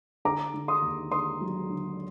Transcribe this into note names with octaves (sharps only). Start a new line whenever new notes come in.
D3 A#5 D6
D3
C6 D#6
D#2
D3 C6 D#6
F#3
D3